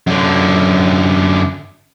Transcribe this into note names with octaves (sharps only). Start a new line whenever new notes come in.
F#2 D3